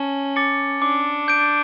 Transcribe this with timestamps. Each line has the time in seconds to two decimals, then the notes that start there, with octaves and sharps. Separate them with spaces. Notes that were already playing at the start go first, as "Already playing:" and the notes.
Already playing: C#4 A5
0.36 D6 A6 C#7
0.82 D4 D6
1.28 G6 D7